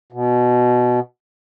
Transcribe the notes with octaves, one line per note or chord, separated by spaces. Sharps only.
B2